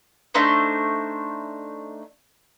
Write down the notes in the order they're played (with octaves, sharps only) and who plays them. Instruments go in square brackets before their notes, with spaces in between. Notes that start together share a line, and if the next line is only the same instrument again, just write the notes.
[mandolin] A3 D4 D#4 C5